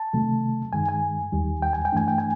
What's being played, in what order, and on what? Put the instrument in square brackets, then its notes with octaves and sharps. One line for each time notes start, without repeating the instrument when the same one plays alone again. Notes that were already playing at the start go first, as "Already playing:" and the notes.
Already playing: [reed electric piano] A5
C3 D#3 F#3 A3
G2 D#3 G#3 G#5
G#5
D#2 D#3 G3
G5
G#5
G5
G2 E3 A3 D4 G#5
G5
G#5